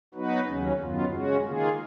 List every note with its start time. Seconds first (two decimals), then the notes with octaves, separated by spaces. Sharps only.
0.14 F#3 B3 D#4 F#4 B4
0.47 D#2 C#3 F#3 C#4
0.79 F#2 D#3 F#3 B3 F4
1.11 C#3 G#3 C#4 F#4
1.43 D#3 A#3 F4 G#4